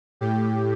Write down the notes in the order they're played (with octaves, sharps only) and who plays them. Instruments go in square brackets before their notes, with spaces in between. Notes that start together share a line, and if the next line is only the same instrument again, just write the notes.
[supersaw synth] A2 G4